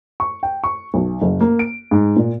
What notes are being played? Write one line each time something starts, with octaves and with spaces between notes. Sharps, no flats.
C#6
G5
C#6
B1
F#1
A#3
D7
G#2
A#2